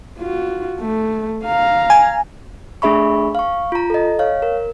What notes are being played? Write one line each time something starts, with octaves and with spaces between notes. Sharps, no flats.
F4 F#4
A3
F5 A#5
G#5
A3 D4 G#4 E5 B5 C#6
F5 C#6
F4 A#5
A4 D#5
C#5 F5
A#4